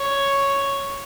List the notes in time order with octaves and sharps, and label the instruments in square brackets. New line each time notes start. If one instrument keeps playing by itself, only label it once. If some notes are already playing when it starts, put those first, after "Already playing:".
Already playing: [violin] C#5